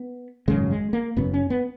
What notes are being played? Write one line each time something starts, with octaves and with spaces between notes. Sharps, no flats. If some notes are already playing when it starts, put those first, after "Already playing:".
Already playing: B3
G#1 F#2 C#3 G#3
G#3
A#3
F#1 F#2 C#3 B3
C#4
B3